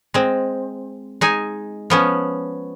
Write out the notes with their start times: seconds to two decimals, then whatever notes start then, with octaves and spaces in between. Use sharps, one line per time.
0.14 G#3 C4
1.21 G#3 D#4 G#5
1.90 F3 B3 C#4